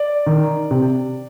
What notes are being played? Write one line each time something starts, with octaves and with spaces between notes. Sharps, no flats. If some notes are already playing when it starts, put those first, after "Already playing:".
Already playing: D5
D#3
C3